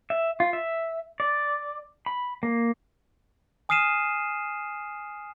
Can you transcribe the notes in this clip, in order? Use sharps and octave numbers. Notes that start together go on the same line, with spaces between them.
E5
F4
E5
D5
B5
A#3
G#5 D#6 F6 C7 D#7 E7